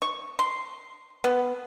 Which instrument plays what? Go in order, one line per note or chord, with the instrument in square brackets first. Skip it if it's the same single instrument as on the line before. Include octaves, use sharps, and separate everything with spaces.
[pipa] C#6
C6
B3